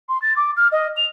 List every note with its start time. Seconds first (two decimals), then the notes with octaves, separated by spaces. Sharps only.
0.09 C6
0.22 A6
0.36 D6
0.57 F6
0.72 D#5
0.97 F7